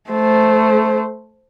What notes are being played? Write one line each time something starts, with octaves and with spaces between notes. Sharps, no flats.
A3 C5